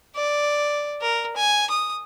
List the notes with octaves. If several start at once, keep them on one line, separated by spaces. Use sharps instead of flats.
D5
A#4
G#5
D#6